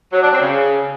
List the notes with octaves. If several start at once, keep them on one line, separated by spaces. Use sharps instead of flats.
F#3
D4
C4
C#3